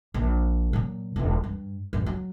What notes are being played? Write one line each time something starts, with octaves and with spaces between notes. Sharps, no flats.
A#1
A#2 F#3
E1 F4
G2
A1 G2
F#3